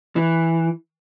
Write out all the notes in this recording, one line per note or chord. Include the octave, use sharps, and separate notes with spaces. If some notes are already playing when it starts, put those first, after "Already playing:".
E3